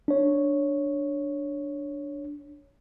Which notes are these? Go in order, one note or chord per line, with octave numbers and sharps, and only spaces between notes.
D4 C#5